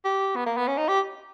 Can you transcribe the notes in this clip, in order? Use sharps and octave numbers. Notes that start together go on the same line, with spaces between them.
G4
B3
A#3
B3
C#4
D#4
G4